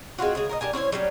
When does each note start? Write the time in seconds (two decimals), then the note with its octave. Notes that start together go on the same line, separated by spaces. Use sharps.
0.18 G#3 C4 F4 F#4
0.35 C#3 G#3 G#4
0.49 A#4 C#5 D#5
0.61 D4 G4 A#4 G#5
0.73 C#4 E4 C5 C#5
0.92 F#3 G3 C#4 D4